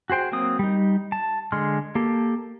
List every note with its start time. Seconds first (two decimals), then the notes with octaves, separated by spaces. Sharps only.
0.10 F#4 G#4 C5 G5
0.32 F#3 A#3 C4 D#6
0.59 G3 D#4
1.12 A5
1.52 D3 G#3 C6 F6
1.95 A#3 G4 A4